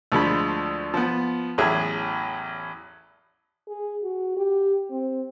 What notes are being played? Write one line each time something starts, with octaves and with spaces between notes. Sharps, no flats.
D2 F3 G#3 B5
F3 B3
A1 E2 F#3 G#4 E5 E6
G#4
F#4
G4
C4